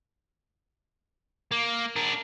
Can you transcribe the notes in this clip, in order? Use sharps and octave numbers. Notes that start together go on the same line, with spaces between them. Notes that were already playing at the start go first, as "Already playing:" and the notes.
A#3
D4 A#4